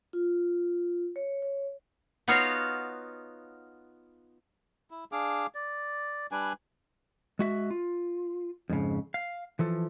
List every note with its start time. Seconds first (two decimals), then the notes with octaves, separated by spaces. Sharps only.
0.13 F4
1.16 C#5
1.42 C#5
2.28 B3 D#4 F4 F#4 C#5 F5
4.90 E4
5.12 D4 G#4 F5 D6
5.54 D5
6.32 G3 D4 B4 G#5
7.39 G#3 F#4 E5
7.70 F4
8.69 F2 G#2 C#3
9.14 F5
9.59 E3 F3 A4